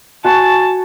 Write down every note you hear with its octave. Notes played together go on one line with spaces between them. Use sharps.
F#4 G#5 A5 C#6